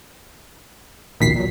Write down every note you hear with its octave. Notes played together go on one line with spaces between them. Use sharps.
A#1 D#2 B2 D#3 B6 C7
A#2 F#3